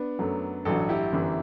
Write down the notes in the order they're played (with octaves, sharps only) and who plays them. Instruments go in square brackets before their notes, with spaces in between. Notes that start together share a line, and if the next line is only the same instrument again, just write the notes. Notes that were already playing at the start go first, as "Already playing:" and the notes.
Already playing: [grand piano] B3 D4
[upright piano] F#2 F#3 A3
[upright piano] A1 G2 F#3 [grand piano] F#4 A4
[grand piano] E4 G4
[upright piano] G1 F#2 E3